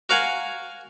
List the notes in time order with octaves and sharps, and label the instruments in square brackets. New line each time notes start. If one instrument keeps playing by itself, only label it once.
[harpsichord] F#4 A#4 F5 F#5 G#5